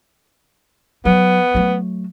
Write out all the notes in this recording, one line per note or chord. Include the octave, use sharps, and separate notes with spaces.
F#3 B3
F#3 A3